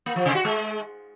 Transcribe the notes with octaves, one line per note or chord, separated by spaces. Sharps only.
A#3
F3
C3
F#4
G#3